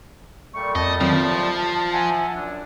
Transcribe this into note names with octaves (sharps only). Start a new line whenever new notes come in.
A#2 G3 A3 C#6
F2 D#5 A5
D#3 F3 F#3 C4
E5 F#5 G#5
F#2 D4